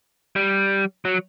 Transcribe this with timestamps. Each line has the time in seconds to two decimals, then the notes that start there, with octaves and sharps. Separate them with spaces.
0.36 G3
1.05 F#3